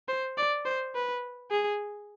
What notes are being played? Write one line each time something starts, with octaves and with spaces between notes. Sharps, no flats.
C5
D5
C5
B4
G#4